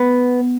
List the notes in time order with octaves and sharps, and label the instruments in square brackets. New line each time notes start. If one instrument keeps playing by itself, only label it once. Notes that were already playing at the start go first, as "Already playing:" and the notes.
Already playing: [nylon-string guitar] B3